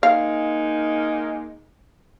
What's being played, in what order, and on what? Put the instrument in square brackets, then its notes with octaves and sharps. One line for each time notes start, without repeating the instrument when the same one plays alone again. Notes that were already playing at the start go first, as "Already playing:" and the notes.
[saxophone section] G#3 A#3 D#4 [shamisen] F5